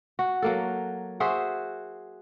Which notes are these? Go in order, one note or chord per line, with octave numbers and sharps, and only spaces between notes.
F#4
F#3 A#3 A4
F#4 G#4 C5 E5